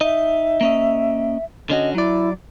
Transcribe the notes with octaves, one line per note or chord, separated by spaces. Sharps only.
D#4 D#5 E5
A#3 C#4 D#5
D3 C#4 F#4 D#5
F#3 E4 D5